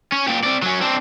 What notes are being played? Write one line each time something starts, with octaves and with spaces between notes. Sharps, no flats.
C#4
A#2 G4
C4 D5
F#3 C#4
C4 D4